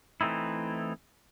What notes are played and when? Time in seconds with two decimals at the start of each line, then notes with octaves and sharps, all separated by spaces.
0.21 E3 A3 C4 D#4 E4